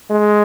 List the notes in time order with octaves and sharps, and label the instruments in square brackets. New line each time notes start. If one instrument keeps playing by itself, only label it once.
[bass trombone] G#3